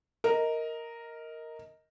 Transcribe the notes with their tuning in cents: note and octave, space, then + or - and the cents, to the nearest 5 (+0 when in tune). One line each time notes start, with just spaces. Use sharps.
A#4 -5 D#5 +15